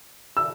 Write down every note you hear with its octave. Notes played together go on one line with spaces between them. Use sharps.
E6